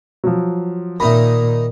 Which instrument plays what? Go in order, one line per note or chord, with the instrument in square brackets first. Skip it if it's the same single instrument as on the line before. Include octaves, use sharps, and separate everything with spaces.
[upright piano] F3 F#3
[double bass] A#2 [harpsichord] D#3 D#4 [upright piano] E5 B5